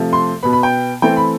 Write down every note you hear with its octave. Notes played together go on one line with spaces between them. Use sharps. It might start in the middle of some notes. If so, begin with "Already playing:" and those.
Already playing: C3 F3 A3
C6
B2 B3 B5
B5
G5
E3 A3 C4 G5
B5